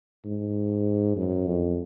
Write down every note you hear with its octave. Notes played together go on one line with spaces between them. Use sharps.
G#2
F#2
F2